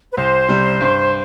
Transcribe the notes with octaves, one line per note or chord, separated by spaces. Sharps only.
B4
C2 C5
C3 G3
G2